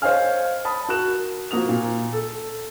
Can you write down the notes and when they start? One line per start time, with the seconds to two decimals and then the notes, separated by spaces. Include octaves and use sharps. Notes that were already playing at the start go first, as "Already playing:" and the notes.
0.02 C5 C#5 D#5 F5 G#5 F6
0.65 A5 B5 D#6
0.89 F#4 A#4 F#6 E7
1.51 F3 A#3 F#4 D#6 F7
1.69 A#2
2.13 A4